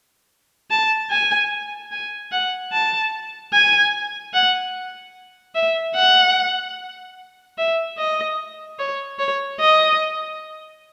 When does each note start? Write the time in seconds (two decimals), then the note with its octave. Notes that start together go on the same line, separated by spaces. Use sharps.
0.70 A5
1.11 G#5
1.92 G#5
2.32 F#5
2.72 A5
3.53 G#5
4.33 F#5
5.55 E5
5.95 F#5
7.58 E5
7.98 D#5
8.79 C#5
9.19 C#5
9.60 D#5